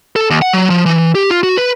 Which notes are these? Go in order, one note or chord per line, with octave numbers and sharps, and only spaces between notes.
A4
D#2
F#5
F#3
F3
E3
G4
F4
F#4
B4